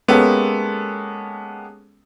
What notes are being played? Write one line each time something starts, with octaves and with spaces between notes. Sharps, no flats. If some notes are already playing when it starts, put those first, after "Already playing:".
G#3 A#3 B3 C#4 G4 A4